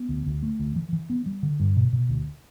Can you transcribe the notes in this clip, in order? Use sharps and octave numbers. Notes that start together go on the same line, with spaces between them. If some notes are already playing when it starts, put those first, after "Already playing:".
Already playing: B3
D2
D2
A3
D2
E3
E3
B3
G3
D3
G2
B2
B2
D2